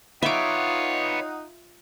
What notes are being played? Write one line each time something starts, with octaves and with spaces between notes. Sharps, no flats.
D#4 F4 B4 C#5 E5 F#5 D6